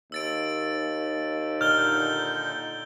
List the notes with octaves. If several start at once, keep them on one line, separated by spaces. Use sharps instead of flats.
D#2 E6 A6 D7
A#2 D3 D#4 F6 G6 G7